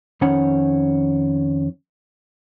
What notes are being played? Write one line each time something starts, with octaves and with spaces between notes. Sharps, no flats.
F2 D#3 C#4 C#5 F#5 B5